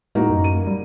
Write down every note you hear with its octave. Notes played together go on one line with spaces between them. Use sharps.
A2 A#3 D#4 F#4
F#2
D#7
G3